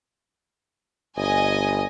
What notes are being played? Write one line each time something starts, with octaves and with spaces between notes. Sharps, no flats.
G1 D#5 G#5